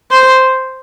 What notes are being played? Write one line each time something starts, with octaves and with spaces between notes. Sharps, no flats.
C5